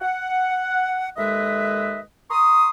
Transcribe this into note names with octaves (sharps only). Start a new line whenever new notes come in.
F#5
D#2 G#3 A4 B4 D#5 E5
A#5 C6 C#6 D#6